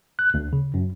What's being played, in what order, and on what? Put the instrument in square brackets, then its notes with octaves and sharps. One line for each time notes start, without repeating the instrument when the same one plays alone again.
[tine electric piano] F#6
D2
C#3
F#2